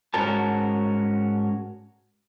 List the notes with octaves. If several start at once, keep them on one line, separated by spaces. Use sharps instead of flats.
G#2 C#4 F#4 A#4 A5